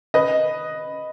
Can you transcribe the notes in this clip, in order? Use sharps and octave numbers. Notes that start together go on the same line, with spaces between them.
B4 D#5